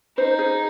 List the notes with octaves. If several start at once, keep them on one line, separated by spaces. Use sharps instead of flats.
D#4 C5
G#4